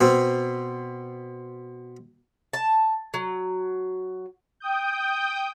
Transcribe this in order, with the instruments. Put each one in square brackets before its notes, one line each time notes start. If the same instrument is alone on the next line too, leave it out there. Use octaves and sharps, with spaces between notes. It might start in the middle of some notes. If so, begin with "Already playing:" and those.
[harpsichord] B2 C4
[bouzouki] A5
F#3
[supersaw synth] G5 D#6 G6